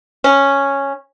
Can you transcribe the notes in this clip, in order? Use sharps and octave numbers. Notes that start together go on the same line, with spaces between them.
C#4